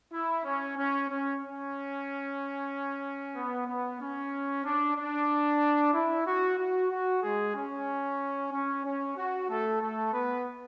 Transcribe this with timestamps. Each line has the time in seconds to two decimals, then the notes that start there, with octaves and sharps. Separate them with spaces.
0.12 E4
0.45 C#4
0.77 C#4
1.09 C#4
1.41 C#4
3.36 B3
3.67 B3
4.00 C#4
4.64 D4
4.96 D4
5.93 E4
6.25 F#4
6.58 F#4
6.90 F#4
7.23 G#3 G#4
7.54 C#4
8.51 C#4
8.84 C#4
9.16 F#4
9.49 A3 A4
9.81 A3 A4
10.13 B3 B4